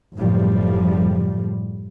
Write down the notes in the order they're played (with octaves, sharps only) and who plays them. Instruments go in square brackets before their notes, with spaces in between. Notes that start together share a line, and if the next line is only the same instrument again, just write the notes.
[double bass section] F#1 A2 F3 G3